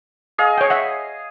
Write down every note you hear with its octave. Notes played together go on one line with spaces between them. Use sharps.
G#4 D#5 F5
C#5 G5
E5 F#5